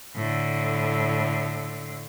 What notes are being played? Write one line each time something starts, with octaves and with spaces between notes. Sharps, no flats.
A2 D3